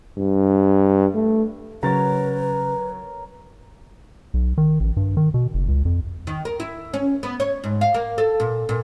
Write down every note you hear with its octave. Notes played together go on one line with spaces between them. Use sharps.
G2
A3
C#3 F#3 A#4 B4 C#5 A6
B1
D#3
A1
G2
D#3
B2
F#1
C#2
F2
D#3
A#4
E4
C#4
B3
C#5
G#2
F5
A#3
A4
A#2
A#2